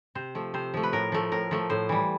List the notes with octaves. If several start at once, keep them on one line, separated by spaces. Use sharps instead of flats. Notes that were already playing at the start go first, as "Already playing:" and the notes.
C3 C5
F3 A3
C3 C5
F3 A3
B4
A2 A#4
F3 A3
A2 A#4
F3 A3
A2 C5
E3 G3